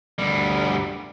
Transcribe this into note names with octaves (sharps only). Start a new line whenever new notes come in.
D2 G3